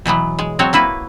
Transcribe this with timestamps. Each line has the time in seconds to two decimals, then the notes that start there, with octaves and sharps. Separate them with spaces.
0.06 B2 E3 F#3 B3
0.39 G#3
0.59 F#3 C4 F#4 C#5
0.73 A#3 E4 F#4 B4